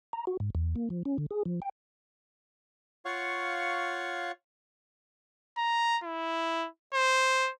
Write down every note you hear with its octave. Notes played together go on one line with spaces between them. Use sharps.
A#5
F#4
G#2
E2
A#3
F3
C#4
D3
G#4
F3
G5
F4 C#5 F5 F#5 C#6
A#5
E4
C5